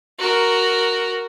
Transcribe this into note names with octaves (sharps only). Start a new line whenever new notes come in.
F#4 A#4